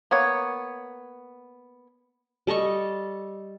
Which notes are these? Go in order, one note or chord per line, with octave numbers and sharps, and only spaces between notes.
A#3 B3 C#5
G3 A4 D#5 C#6